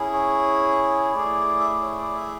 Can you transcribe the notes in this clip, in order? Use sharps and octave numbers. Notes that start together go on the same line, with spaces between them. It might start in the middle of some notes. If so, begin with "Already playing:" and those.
Already playing: C#4 E4 G#4
C#5
A3 E4 G#4 D5
E5
D5
C#5
D5
E5